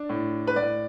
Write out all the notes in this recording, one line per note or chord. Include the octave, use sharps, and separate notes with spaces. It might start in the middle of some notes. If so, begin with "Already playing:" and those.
Already playing: D4
A2
B4
A2 D5